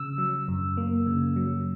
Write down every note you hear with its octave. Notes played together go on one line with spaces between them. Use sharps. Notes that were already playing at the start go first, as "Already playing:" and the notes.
Already playing: C#3 E6
F#3
F#2
A#3
C#3
F#3